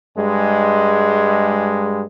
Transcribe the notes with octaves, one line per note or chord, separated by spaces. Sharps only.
G2 G#3